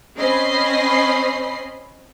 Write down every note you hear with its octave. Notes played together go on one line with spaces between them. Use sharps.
C4 C#4 D#5 B5 C7